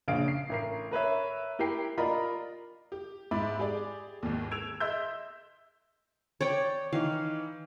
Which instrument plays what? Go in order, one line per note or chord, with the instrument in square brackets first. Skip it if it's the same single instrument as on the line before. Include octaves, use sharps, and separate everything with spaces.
[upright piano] A#1 C#3 F5 D7
C7
A1 A#4 C7
A#4 B4 C#5 E5
E4 G4 A#4 G5 C7
F4 A#4 D5 D#5 A#5 B5
[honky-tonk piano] G4
G#2 E5 B5 D6 A6
G4 G#4 D5
G#1 D#2
E6 G#6 D7 E7 F7
D#5 E5 C6 E6 G6
[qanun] C#5 D5 G5
[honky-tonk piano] D#3 E3 [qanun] F5